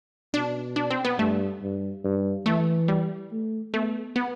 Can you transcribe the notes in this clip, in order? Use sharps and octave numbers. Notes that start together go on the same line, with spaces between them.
B2 D4
D4
C4
B3
G2 A3
G2
G2
E3 A3
G3
A3
A3 B3
B3